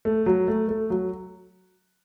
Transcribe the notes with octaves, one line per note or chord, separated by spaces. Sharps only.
A3
F#3
A3
A3
F#3